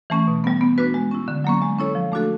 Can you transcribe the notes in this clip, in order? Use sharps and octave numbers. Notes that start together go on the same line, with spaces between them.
E3 A3 C#4
B2
G3 B3
B3
D4 F#4 B4
G#3
C#4 E4
D3
F#3 A#3 C#4
G#3
C#4 E4 A4 C#5
F3
A3 D4 F#4 A4